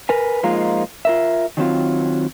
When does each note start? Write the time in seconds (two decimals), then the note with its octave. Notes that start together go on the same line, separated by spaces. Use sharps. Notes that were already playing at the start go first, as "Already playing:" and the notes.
0.09 A#4 B4 G#5
0.43 F3 G#3 A#3 D#4 F4
1.05 F4 A#4 E5
1.57 D#3 F#3 C4 F4